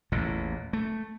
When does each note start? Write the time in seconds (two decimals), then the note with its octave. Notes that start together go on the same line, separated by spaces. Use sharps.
0.12 A1 E2 A#2
0.73 A3